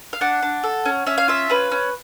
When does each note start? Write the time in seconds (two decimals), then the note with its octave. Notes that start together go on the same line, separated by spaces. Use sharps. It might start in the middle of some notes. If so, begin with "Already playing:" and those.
0.13 F5
0.21 D4 F#5
0.42 D4
0.63 A4
0.85 C#4
1.06 C#4 E5
1.18 F5
1.28 F4 E5
1.50 C#4 B4
1.71 C#4